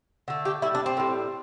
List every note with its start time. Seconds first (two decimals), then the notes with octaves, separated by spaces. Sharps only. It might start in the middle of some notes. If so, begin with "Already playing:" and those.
0.28 D3 A3
0.45 G4
0.62 A2 G3 E4
0.75 D4
0.86 C4
0.97 A2 G3